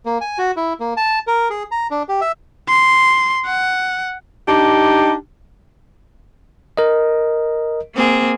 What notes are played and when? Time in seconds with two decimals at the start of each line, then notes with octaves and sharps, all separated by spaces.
0.05 A#3
0.21 G#5
0.38 F#4
0.57 E4
0.80 A#3
0.97 A5
1.27 A#4
1.50 G#4
1.71 A#5
1.91 D4
2.08 G4
2.21 E5
2.69 C6
3.46 F#5
4.48 D4 D#4 G4
6.77 A#4 D#5
7.95 A#3 C4 G#4